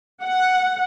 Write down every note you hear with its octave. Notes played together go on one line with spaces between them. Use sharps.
F#5